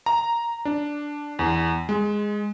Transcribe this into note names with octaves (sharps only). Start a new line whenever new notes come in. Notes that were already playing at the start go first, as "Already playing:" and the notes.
A#5
D4
E2
G#3